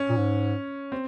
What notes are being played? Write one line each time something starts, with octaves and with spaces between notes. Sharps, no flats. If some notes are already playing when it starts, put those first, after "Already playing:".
Already playing: C#4
A#2
G#2
C4